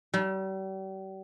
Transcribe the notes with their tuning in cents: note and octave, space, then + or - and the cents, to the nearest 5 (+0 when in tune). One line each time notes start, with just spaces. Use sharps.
G3 -40